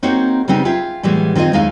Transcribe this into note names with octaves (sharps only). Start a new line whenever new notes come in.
A#3 C4 D#4 F#4 C#5
C#3 G3 B3 C4 D#4
F4 G#4 E5 G5
A2 E3 G3 G#3 B3
D#3 C4 F4 G#4 D#5
D#2 G#3 D#4 E4 F5